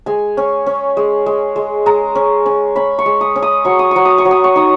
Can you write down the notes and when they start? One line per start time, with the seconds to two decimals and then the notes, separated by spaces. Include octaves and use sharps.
0.06 G#3 G#5
0.37 C#4
0.66 C#4
0.97 G#3
1.26 G#3
1.56 G#3
1.86 G#3 A#5
2.15 C#4
2.46 C#4
2.76 C#4 B5
2.99 C#6
3.06 G#3
3.21 D#6
3.36 C#4
3.42 D#6
3.65 F#3 C#6
3.79 D#6
3.91 F#3 C#6
4.05 D#6
4.18 C#6
4.25 F#3
4.31 D#6
4.44 C#6
4.56 D#4 D#6